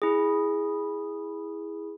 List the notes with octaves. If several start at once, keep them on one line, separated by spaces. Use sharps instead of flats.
E4 G#4